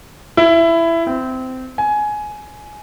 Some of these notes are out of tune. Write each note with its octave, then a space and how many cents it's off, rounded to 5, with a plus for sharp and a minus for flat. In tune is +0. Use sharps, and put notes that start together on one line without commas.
E4 +15
C4 -20
G#5 +15